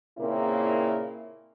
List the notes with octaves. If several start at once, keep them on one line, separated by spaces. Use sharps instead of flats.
A#2 C#3 A#3 C4 E4